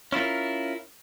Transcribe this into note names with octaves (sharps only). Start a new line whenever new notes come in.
C#4 E4 F4 A#4